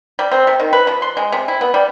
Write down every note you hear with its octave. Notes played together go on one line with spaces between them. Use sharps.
G3
C4
C3
D#3
B4
F3
C6
G#3
C3
E4
B3
G3